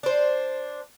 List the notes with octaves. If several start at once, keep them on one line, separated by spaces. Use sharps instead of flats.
D4 C5